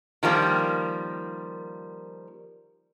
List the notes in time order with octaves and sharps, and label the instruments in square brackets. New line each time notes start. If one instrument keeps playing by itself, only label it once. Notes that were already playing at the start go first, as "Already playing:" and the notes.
[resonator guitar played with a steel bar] D#3 F3 G3 A#3